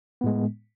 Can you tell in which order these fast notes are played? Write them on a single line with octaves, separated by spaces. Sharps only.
B3 A2 G#3